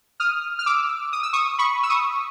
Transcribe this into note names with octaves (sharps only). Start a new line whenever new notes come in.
D#6 F6
F6
D6 E6
D#6
E6
C#6 D#6
B5 C#6
E6
C#6 D#6